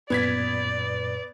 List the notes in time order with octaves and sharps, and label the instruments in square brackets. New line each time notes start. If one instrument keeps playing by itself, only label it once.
[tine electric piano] F#2 A#2 [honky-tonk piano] B3 G#6 B6 [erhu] D5